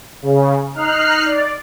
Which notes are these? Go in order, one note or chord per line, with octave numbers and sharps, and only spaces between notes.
C#3
D#4 F6 F#6 C7
D5